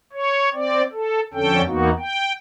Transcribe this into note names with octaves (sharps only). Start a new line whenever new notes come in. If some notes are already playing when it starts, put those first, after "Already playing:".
C#5
C4 D5
A4
F2 D3 C#4 A4 G5
E2 A#3 B3 D#4 F#4
G5